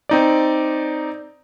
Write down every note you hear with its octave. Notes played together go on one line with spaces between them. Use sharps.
C4 D#4 D5